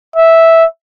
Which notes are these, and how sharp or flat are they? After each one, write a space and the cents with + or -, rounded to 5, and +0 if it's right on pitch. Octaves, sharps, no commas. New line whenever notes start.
E5 -5